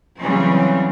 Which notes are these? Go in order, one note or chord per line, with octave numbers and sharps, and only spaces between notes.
C#3 E3 F#3 G3 C4 C#4